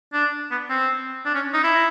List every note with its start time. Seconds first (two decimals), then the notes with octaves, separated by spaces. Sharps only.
0.13 D4
0.51 B3
0.70 C4
1.26 D4
1.35 C#4
1.54 D#4
1.64 E4